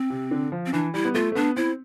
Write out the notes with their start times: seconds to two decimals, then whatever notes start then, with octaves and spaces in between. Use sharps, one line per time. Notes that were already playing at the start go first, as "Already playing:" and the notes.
Already playing: C4
0.10 C3
0.31 D3
0.52 F3
0.66 C4
0.73 E3 D4
0.94 G3 E4
1.05 B3
1.14 A3 F4
1.32 A3
1.35 B3 D4
1.57 C4 E4